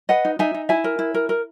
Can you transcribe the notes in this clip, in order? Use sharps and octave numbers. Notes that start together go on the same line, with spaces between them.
B4 D#5 F#5
D#4
D#4 E5 G#5
D#4
E4 E5 G#5
A#4
E4
A#4
A#4